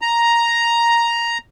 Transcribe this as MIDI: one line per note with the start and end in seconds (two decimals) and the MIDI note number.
0.02 1.38 82